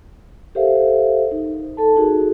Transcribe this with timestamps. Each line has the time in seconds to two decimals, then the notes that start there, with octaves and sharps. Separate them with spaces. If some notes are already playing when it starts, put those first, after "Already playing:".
0.55 G4 A4 A#4 C5 E5 F5
1.31 D#4
1.77 A4 A5
1.97 D#4 F#4 G#4 A#4